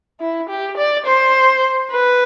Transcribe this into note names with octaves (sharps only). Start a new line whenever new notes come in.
E4
G4
D5
C5
B4